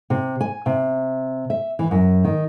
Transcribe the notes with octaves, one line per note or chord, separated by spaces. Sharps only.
C3
G#5
C3
E5
E3
F#2
D#3